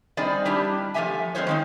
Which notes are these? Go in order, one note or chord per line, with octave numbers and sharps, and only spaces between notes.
G3 C4 D#4 G#4 C5 D5
G3 D4 E4 G4
F3 A3 B3 G4 E5 G#5
G#3 C4 F4 C5 C#5
D#3 C4 D#4